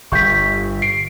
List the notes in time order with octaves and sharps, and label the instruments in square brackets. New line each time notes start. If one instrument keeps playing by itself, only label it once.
[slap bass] G1 [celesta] C#6 G6 B6
[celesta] C7 D7